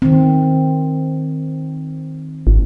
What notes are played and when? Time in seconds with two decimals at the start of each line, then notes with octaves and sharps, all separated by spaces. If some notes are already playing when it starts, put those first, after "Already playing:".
0.02 D#3 C4
2.47 G#1